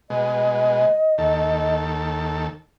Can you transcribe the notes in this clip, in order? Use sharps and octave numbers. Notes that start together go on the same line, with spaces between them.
B2 G#3 D#5
D#2 A4